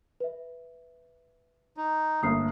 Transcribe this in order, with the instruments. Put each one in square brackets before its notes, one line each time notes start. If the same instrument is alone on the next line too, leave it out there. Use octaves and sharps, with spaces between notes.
[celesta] B4 E5
[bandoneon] D#4
[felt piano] G1 A3 A#3 [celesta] D#6 C7